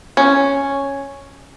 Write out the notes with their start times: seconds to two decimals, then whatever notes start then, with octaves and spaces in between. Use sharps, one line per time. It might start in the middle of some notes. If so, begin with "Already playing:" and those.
0.17 C#4